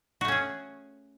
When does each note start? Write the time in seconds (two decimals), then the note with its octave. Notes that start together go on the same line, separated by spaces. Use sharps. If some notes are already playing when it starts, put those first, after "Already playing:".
0.21 F#4
0.25 A3
0.28 C#4
0.32 G#4